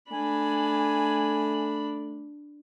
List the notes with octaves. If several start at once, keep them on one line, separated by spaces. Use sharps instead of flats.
A3 D4 G#5 B5